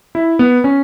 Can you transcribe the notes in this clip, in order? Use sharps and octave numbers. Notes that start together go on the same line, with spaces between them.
E4
B3
C#4